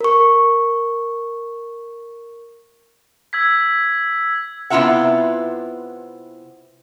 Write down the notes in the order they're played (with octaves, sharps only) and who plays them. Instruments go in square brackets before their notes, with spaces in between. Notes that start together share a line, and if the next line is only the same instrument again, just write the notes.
[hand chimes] A#4 C#6
[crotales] E6 G#6 B6
[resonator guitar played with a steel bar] C3 B3 E4 F4 E5 F#5